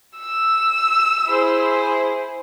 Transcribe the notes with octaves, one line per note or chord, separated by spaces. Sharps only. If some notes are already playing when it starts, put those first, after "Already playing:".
E6
E4 G#4 C5